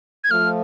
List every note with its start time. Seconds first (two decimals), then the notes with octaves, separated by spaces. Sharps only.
0.24 G#6
0.31 F3 A3 F6